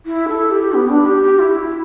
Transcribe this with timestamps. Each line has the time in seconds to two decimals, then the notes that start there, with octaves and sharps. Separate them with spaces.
0.05 E4
0.27 A4
0.50 G4
0.73 B3
0.88 D4
1.05 G4
1.22 G4
1.38 E4